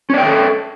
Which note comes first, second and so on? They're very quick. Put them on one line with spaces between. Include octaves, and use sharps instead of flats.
C#4 D5 G5 E5 A4